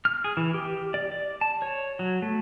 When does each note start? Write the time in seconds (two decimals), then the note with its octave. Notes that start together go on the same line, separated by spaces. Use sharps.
0.05 F6
0.24 G#4
0.37 E3
0.54 G4
0.94 D5
1.12 D5
1.41 A5
1.62 C#5
1.99 F#3
2.22 A3